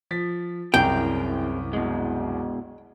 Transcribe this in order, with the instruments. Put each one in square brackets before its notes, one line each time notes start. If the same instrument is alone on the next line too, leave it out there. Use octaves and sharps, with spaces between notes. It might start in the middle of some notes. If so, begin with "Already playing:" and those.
[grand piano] F3 A6 B6
[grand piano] C2 F#2 E4 [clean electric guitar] C3 G#4 A#4 [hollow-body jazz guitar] G5
[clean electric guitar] B2 G#3